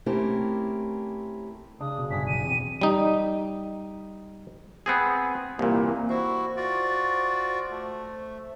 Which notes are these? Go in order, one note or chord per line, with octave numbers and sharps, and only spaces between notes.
A3 C4 C#4 E4 G4 A#4
C#3 D4 D#6
B1
G1 D4 G#4 B6
D#7
E2 C4
G3 D#4
B3 C4 G#4
C2 A#2 E3 A#3
E4 F#4 C5
F4 F#4 D5
A3